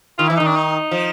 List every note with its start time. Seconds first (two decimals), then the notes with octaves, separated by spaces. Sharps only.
0.18 D#3 F4
0.27 E3 E4
0.37 D#3 D#4
0.46 D4
0.55 D#4
0.91 F3